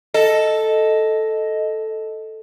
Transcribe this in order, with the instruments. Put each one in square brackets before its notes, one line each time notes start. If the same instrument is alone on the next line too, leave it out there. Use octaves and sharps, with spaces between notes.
[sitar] A4 [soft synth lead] D#5